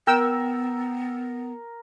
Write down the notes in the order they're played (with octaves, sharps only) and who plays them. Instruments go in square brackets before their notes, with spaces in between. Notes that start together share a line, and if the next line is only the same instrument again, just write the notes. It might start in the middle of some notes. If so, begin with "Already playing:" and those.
[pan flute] B3 [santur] A#4 [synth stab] G5 E6